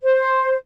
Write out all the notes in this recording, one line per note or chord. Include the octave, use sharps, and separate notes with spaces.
C5